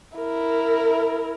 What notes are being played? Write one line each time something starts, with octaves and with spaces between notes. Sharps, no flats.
E4 A#4